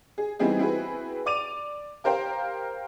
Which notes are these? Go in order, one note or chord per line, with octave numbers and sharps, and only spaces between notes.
G#4
E3 G3 B3 C4 D#4 G#4
C4 E4 F#4 G#4 B4
D5 D6 D#7 F7
G4 A#4 C5 F5 G5